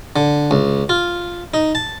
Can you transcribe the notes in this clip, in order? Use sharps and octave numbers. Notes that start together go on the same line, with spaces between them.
D3
C#2
F4
D#4
A5